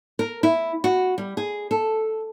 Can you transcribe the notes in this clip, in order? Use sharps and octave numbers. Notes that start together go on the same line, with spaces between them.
A#4
E4
F#4
G3
G#4
A4